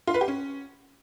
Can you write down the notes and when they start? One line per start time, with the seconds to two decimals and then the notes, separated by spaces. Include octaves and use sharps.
0.07 F4
0.14 B4
0.21 G4
0.28 C#4